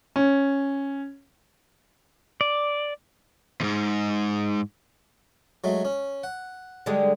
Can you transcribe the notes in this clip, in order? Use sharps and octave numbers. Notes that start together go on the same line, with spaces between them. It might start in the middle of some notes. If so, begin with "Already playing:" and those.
C#4
D5
E2 G#2
F#3 G#3 A3
C#4
F#5
D3 G3 G#3